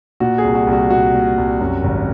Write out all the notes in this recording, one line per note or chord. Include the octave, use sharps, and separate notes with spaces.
A#2 F#4
G#4
C2
F#4
C2
F#4
A#2 F#4
A#2
C2
F#2
G#1